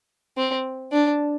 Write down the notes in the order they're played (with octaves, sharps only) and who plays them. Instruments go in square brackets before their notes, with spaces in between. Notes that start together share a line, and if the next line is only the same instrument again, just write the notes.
[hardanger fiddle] C4
D4